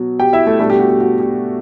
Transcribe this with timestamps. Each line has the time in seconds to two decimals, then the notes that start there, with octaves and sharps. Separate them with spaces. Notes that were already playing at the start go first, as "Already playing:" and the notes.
Already playing: B2 F#3
0.20 G4 G5
0.33 E4 E5
0.47 A3 A4
0.59 B2 G3 A3 D4 A4
0.70 G4
0.79 F#4
0.89 G4
1.00 F#4
1.20 G4